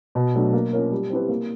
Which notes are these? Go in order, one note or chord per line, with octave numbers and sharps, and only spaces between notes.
B2
F#3 A3 D4
A#3
C#4 F4 A#4 C#5
G3
C4 E4 G4 B4
A#3